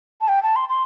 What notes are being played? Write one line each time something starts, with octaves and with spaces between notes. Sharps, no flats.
A5
G5
A5
C6
C6